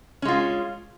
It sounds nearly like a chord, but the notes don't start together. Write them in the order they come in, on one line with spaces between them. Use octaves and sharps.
C#4 G#3 F4